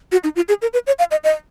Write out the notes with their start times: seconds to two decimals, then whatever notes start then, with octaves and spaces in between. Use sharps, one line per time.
0.12 F#4
0.24 D#4
0.36 F4
0.48 G#4
0.62 A#4
0.73 B4
0.87 C#5
0.99 F5
1.11 D#5
1.24 D#5